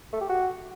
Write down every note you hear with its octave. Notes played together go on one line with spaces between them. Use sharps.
A3
G4
F#4